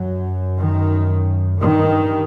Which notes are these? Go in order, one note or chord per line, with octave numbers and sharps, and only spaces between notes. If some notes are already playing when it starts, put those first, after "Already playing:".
Already playing: F#2 F#3
D#3
G2 D#3